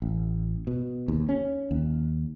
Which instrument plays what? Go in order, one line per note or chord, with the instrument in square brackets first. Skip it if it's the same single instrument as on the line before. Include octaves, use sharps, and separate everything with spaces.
[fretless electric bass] A1
B2
D#2
C#4
D#2